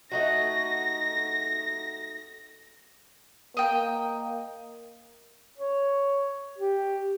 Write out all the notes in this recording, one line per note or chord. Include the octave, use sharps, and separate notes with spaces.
A3 D#4 F#4 A#6
A#3 D#5 G5
C#5
G4